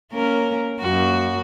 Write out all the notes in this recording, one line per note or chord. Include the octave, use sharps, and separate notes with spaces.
A#3 C#4 A#4
F#2 A#3 F#4